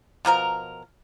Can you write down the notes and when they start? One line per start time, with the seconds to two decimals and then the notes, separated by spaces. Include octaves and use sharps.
0.25 B2 F3 A#4 A#5